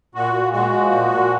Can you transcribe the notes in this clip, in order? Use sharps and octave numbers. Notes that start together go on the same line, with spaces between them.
A#2 F#4
A#2
G#3 F#4
F3
A#2
A#2